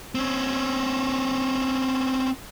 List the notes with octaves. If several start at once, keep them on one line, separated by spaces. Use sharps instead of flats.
C4 C#4